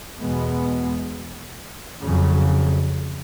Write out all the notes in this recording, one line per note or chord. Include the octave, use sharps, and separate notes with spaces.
E2 B2 G#3 B3
F2 C#3 F#3